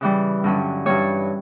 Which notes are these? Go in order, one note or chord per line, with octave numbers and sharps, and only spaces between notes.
C#3 E3 G3
G2 D3 F#3 C#4
G2 E3 G3 C#5